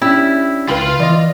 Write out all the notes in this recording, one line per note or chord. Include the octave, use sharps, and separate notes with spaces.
C#4 D4 E4 G4
C#2 F4 B4 F5 G5 B5
E3 D5 D#5